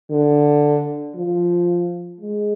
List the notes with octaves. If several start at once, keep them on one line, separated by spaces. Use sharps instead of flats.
D3
F3
G#3